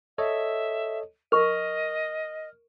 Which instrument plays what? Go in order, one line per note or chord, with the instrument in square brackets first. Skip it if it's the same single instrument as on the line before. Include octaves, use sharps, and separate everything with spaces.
[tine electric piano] A4 C#5 D#5 [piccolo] E5
[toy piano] A#4 C#6 [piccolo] D#5 [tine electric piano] F6